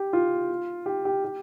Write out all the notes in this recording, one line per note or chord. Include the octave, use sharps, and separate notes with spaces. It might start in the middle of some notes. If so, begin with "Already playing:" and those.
Already playing: G4
F4
G4
G4
G4